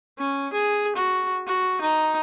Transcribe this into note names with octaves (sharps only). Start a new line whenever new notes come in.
C#4
G#4
F#4
F#4
D#4